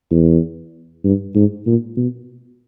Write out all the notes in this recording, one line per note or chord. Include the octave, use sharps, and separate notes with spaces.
E2
G2
G#2
A#2
B2